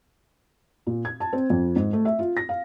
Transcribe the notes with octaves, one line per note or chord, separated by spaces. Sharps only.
A#2
G#6
A5
C4
F2
G#2
A3
E5
F4
A#6
F5